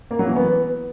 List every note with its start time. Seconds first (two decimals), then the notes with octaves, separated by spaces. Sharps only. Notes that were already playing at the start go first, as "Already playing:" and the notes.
0.11 A#3
0.19 F#3
0.28 E3
0.36 B3